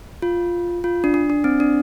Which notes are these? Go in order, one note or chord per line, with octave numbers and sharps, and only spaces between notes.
F4
F4
D4
D4
D4
C4
D4